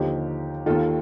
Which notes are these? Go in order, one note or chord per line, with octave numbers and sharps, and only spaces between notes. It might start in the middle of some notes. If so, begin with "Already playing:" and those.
Already playing: D#2 D3 F3 D#4 G4
D#2 D#3 F4 A4